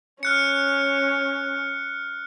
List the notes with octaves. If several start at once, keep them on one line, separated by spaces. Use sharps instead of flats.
C#4 F6 F#6 C#7